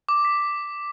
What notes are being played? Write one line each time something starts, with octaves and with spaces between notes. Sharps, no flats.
D6
B6